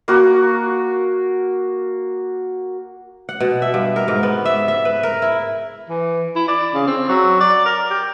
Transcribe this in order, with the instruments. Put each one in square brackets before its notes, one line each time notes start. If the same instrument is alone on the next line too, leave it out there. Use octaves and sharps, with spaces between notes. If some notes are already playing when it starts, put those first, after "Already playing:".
[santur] A#3 F#4
[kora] F#5
B2
E5
G2
A#4
G#2
B3
E5
E5
B4
A#4
E4
[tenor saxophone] E3
E4
D5
C#3
C4
F#3
D5
A#4
G4